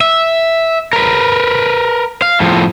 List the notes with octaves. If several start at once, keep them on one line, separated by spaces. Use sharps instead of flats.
E5
A#4 B4
F5
A2 F3